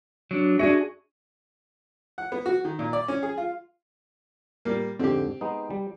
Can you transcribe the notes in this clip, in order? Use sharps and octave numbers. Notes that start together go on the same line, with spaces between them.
F#3 D4
D4 F#4 G#4 E5
F#5
B3
F#4
D#3
A#2
D5
C#4
G#4
F4
G3 A#3
F2 G#2 D3 C4 G4
G#3 B3 D#4
G3